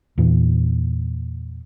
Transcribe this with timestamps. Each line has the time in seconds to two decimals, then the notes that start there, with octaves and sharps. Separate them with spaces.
0.18 E2 A#2 E3